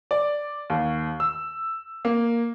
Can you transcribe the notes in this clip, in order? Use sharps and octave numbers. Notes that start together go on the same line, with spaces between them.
D5
D#2
E6
A#3